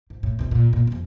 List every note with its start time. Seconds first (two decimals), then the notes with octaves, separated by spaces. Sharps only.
0.10 G#2
0.23 A2
0.39 D2 C3
0.51 A#2
0.73 A#2
0.87 F2 C3